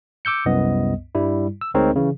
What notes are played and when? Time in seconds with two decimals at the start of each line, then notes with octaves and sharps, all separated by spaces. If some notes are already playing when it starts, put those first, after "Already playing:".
0.25 D6 E6 G6 C#7
0.46 C2 F#2 B3 D#5
1.15 G2 G3 E4
1.61 E6
1.74 D2 G#3 C4 D#4 A#4 C#5
1.96 C#3 E3